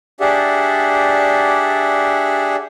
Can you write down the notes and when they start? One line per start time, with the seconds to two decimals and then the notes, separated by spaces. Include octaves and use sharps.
0.20 D4 G4 G#4 D5 E5 F#5